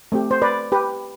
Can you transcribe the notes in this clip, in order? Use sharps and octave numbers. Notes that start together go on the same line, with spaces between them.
A3 C4 G4
C5
B4 D5
G4 B4